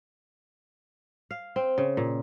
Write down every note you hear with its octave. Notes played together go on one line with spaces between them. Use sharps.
F5
C4
C#3
A#2